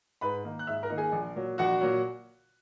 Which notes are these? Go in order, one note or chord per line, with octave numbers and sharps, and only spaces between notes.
G#2 B4 B5
D#3 A#3 D#4
F#6
G#2 E5 E6
A#4 A#5
D#3 A#3 D#4
G#4 G#5
A#1
A#2 F#3
A#1 F#4 F#5
A#2 F#3